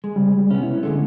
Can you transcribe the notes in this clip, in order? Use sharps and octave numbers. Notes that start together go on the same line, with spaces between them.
G#3
C#3 G3
G3
C3 B3 C#4
E4
D3 G#3 A3